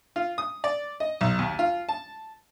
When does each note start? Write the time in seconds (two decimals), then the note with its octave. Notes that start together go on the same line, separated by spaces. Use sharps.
0.16 F4
0.38 D#6
0.64 D5
1.00 D#5
1.21 B1
1.39 D#2
1.59 F4
1.89 A5